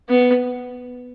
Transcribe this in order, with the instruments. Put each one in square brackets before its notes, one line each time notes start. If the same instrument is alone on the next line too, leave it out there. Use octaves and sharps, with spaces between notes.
[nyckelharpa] B3